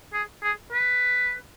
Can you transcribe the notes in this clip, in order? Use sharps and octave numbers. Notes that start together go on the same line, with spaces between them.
G#4
G#4
B4